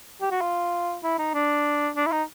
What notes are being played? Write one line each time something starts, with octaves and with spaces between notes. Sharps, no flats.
G4
F#4
F4
E4
D#4
D4
D4
E4
D#4